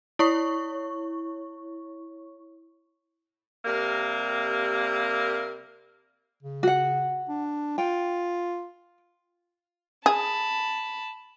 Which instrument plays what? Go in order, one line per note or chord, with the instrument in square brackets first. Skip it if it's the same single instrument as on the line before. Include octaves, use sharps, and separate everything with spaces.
[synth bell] E4 C#5 C#6
[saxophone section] C3 G3 A#3 A#4
[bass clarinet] C#3
[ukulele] F#4 F#5
[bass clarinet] D4
[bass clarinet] F4 [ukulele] G5
[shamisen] G#4 [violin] A5 B5